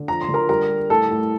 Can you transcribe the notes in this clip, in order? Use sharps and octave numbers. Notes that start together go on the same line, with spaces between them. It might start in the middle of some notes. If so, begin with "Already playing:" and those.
Already playing: D3
F3 A#5
C6
D3
A#4 A#5
G3 A#4 A#5
G3
A2 A4 A5
A2